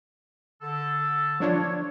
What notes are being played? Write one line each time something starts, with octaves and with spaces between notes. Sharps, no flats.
D3 A4
F3 D4 C#5